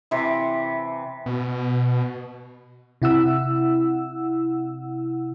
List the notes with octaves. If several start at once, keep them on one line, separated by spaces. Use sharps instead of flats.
C3 E3
B2
C3 E4 F#5 E6